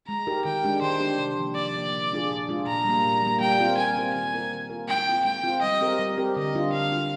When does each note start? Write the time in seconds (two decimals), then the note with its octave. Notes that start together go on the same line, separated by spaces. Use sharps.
0.08 G#3 A#5
0.27 D#4 G4 A#4
0.45 D#3 G5
0.64 G#3 D4 G4
0.82 D#3 C5
1.00 G#3 D4 G4
1.19 C3
1.37 F3 A#3
1.56 C3 D5
1.75 F3 A#3
1.92 A#2
2.11 G#3 D4 F4 G#4
2.30 A#2
2.49 G#3 D4 F4 G#4
2.67 A#2 A#5
2.85 G3 A#3
3.04 A#2
3.22 G3 A#3
3.41 G3 G5
3.59 C4 F4 A#4
3.78 G3 G#5
3.96 C4 F4 A#4
4.14 D#3 G#5
4.33 A#3 F4 A#4
4.52 D#3
4.70 A#3 F4 A#4
4.88 G#3 G5
5.07 C4 F4
5.25 G#3 G5
5.43 C4 F4
5.62 G3 D#5
5.81 C4 G4 A#4
5.99 G3
6.18 C4 G4 A#4
6.36 D3 D#5
6.55 G3 D4 F4
6.73 D3 F5
6.92 G3 D4 F4